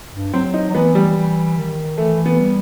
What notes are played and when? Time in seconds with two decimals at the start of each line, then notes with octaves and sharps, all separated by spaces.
0.13 G2
0.33 F#3 C4
0.54 D#4
0.70 F#3
0.75 E3 B3
0.95 G3
1.16 E3
1.57 D#3
1.98 E3 A3
2.26 B3
2.39 G3